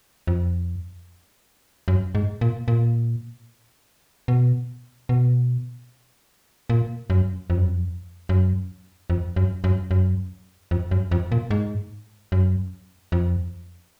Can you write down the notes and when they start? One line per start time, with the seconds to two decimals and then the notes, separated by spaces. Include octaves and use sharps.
0.27 F2
1.88 F#2
2.15 G#2
2.41 A#2
2.68 A#2
4.28 B2
5.09 B2
6.70 A#2
7.10 F#2
7.50 F2
7.57 F#2
7.65 F2
8.29 F#2
9.10 F2
9.36 F#2
9.64 F#2
9.91 F#2
10.71 F2
10.91 F#2
11.11 F2
11.32 A#2
11.51 G#2
12.32 F#2
13.12 F2